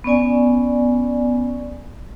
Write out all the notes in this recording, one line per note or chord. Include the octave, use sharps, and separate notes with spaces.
B3 C#4 D5 G#5